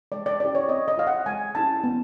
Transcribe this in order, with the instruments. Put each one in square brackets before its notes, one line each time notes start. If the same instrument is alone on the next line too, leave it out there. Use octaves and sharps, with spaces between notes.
[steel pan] G#3 D5
D5
C#4 E4 G4 D5
C#5
C4 D#5
D#5
F4 F5
F#5
G#3 G#5
C#4 E4 G4 A5
B3